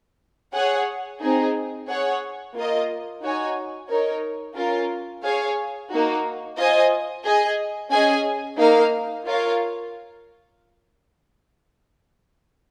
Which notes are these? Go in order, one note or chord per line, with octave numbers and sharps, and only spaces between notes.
G#4 C#5 F#5
C4 D#4 G#4
G#4 C#5 F#5
A#3 F4 A#4 D#5
D#4 F#4 C#5 G#5
D#4 A#4 C#5
C#4 F4 A#4
G#4 C#5 F5
A#3 D#4 F#4
F4 C5 D#5 G#5
G#4 D#5 G#5
C#4 G#4 D#5 G#5
A#3 D#4 A#4 F5
F4 A#4 C#5 F5